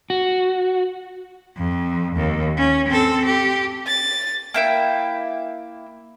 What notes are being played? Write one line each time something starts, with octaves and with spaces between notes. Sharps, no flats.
F#4
F2
D#2
C#4
C4 A4
G4
A6
A#3 E4 G5